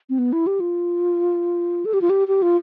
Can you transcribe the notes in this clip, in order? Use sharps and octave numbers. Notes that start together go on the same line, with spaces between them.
C4
B3
E4
G4
F4
A4
G4
F4
G4
G4
F4